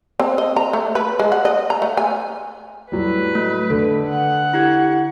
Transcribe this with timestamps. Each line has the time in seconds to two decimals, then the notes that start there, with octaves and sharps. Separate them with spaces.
0.20 C4
0.38 D#5
0.56 A#5
0.73 A3
0.95 B4
1.19 G#3
1.32 F#5
1.45 D#5
1.70 A#5
1.82 A3
1.97 G#5
2.92 A2 F#3 G3 B4
3.35 A3
3.70 D3 A4
4.09 F#5
4.53 E4 G4 G#6